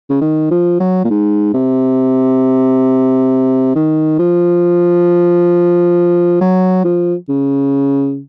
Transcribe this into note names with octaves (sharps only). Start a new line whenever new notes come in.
C#3
D#3
F3
F#3
A#2
G#2
C3
D#3
F3
F#3
F3
C#3